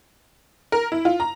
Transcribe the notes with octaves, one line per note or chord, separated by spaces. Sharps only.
A#4
E4
F4
A#5